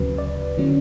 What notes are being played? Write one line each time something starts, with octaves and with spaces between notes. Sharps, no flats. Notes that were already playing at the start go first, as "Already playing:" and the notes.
Already playing: D2 C#3 F#3 B4
D5
D3 F#3 C#4